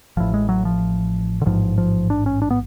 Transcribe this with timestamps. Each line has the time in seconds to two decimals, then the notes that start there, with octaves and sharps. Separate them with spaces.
0.17 A1 A2 F3
0.34 G#3
0.49 F#3
0.65 F3
1.42 D3
1.46 A1 G#2 F3
1.78 F3
2.10 D4
2.26 C#4
2.42 D4
2.51 B3